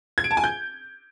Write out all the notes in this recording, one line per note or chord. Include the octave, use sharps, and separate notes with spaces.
G#6
D7
A5
G#5
G6